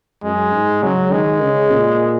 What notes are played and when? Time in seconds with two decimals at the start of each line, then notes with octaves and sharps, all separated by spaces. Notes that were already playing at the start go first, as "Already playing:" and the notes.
0.23 F#2 G#3
0.53 G#2
0.82 C#3 F#3
1.12 D#3 G#3
1.42 C#3
1.71 A#2